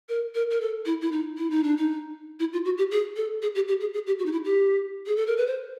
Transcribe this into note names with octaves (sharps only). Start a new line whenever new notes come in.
A#4
A#4
A#4
A4
E4
E4
D#4
E4
D#4
D4
D#4
E4
F4
F#4
G4
G#4
A4
G#4
G4
G4
G#4
G#4
G4
F#4
D#4
E4
G4
G#4
A4
A#4
B4
C5